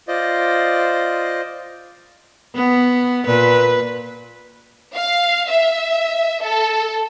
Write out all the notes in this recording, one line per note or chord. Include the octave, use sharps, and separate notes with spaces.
F4 C5 D5 D#5
B3
A#2 B4
F5
E5
A4